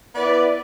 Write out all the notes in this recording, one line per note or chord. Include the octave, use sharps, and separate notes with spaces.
B3 E4 B4 D5